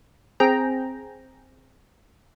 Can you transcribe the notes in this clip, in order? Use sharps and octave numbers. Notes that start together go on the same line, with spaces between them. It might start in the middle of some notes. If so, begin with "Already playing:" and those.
C4 G#4 G5 A#5